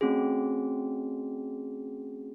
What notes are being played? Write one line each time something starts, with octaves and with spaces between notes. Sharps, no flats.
A3 C4 C#4 F#4 G#4